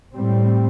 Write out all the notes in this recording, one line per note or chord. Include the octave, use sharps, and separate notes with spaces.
A2 G3 C4